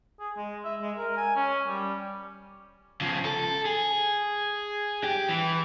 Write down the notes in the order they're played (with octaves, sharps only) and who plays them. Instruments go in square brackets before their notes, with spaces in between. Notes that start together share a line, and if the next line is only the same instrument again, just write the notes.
[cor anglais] G#4
G#3
E5
G#3
A#4
G#5
C#4
G3
[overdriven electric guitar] C#3 F3
A4
G#4
G4
E3